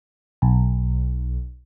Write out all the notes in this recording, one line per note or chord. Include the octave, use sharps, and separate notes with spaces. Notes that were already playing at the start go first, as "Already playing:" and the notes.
B1